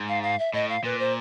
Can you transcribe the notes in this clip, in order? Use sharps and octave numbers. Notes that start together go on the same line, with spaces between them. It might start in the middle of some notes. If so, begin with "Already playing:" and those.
Already playing: G#2
F5
F5
E5
A2 D#5
F5
A#2 B4
C5